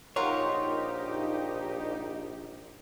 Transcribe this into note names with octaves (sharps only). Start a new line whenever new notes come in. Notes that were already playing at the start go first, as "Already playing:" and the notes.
A#1 D#4 F4 G4 A#4 C#5 F#5